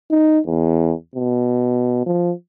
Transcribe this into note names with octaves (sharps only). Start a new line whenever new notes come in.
D#4
E2
B2
F3